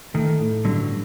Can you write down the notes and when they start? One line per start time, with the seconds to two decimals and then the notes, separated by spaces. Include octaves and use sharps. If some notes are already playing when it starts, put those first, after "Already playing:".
0.14 D#3 A3
0.40 A2
0.65 G2 D3 F#3